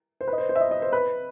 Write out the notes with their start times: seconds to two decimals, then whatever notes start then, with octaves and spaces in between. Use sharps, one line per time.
0.21 C5
0.27 B4
0.33 D#5
0.38 C5
0.49 C5
0.56 E5
0.60 D#5
0.71 D#5
0.82 C5
0.93 B4